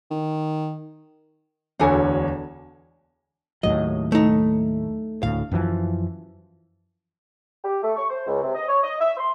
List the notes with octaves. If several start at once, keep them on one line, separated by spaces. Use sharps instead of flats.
D#3
E1 D2 D4 A4 C#5 G#5
D#2 A2 F#3 D#5
A3 D#4
D2 A2 F5
F#2 E3 F3
G4
A3
C#6
C5
C#2
C3
D#5
C#5
D#5
E5
C6